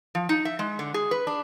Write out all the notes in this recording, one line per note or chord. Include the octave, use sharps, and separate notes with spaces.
F3
D#4
E5
G#3
D3
G#4
B4
D4